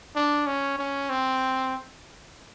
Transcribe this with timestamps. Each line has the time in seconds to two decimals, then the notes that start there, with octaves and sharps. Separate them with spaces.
0.16 D4
0.47 C#4
0.79 C#4
1.09 C4